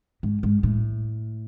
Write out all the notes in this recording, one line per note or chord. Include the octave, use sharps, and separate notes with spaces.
G#2
G#2
A2